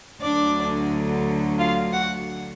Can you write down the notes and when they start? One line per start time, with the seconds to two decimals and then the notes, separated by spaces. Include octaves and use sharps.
0.21 D2 D3 F#3 D4 D5
1.59 F4 F5
1.93 F#4 F#5